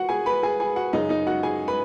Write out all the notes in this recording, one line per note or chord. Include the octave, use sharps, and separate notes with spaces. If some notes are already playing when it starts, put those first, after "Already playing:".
Already playing: F#4 F#5
G#4 G#5
B4 B5
G#4 G#5
G#4 G#5
F#4 F#5
F#2 C#3 G#3 D#4 D#5
D#4 D#5
F#4 F#5
G#4 G#5
B4 B5